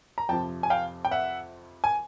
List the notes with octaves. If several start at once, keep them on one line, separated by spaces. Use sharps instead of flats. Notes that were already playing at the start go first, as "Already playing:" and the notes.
A#5
F2 C3 F3 G5 A5
G#5
F5 G5
G5
E5 F#5
G#5